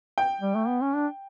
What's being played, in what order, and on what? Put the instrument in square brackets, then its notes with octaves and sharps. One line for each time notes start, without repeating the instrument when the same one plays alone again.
[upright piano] G5
[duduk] G3
A3
B3
C#4
D4